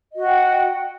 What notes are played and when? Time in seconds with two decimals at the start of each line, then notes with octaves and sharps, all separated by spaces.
0.12 D#5
0.16 F#4
0.20 F#5
0.24 G5